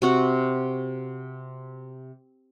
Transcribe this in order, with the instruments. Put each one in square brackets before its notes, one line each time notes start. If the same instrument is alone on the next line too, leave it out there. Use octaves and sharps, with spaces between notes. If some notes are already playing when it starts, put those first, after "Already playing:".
[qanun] C3 F#4 F#5